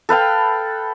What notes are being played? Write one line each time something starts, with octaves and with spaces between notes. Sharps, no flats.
A4 B4 F5 G5